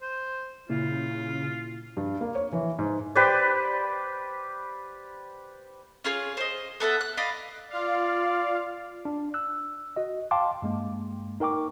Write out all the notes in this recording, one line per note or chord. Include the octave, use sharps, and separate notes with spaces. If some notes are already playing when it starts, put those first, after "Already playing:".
C5
A#2 C#3 A#3 E4 F4
G2
A#3
C#5
E3
G#2
G4 B4 C5 D5
C#4 F4 G#4 C#5
C5 D#5
B3 A4 E5 F#5
F#6
D5 D#5 F5 B5
F4 D5 F5
D4
E6 F#6
F#4 D#5
F5 G5 A5 C6 D6
G2 G#3 A#3
D#4 A#4 G5 C#6 D6